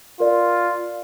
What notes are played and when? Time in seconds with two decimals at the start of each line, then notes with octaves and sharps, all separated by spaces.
0.20 F4 A#4 D5